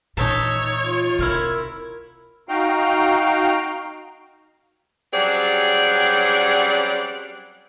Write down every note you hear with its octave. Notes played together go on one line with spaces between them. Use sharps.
A#2 E3 D#4 C#5 E5 A5
F4
C3 E4 A#4 C#5
D#4 F#4 F5 G5 A#5
F#3 G3 C4 C#4 G#4 D5